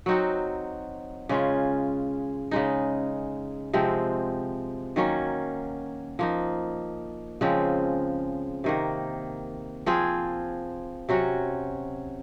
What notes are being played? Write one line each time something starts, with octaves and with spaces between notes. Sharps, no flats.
F#3 C4 D#4 F#4
C#3 G#3 C#4 F4
C#3 G#3 D#4
C3 F3 G#3 C4
D#3 F#3 A#3 C#4
F3 A#3 D#4
C#3 F3 G#3 C4
C3 D#3 A#3
F3 C4 F4 G#4
C3 F#3 C#4 F#4